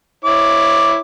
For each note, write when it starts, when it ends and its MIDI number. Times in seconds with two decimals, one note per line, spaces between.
0.25 0.99 64
0.25 0.99 73
0.25 0.99 86